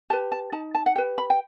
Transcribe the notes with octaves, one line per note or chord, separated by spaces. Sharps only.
G4 B4 A5
A5
D#4 A5
A5
F#5
G4 B4 G5
B5
G5